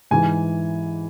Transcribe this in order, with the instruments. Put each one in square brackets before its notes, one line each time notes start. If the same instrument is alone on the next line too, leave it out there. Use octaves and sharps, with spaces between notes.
[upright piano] G#2 E3 G#5